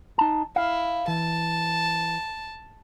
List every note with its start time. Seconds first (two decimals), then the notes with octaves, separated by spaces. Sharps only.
0.18 D#4 A5
0.56 E4 F5
1.08 E3 A5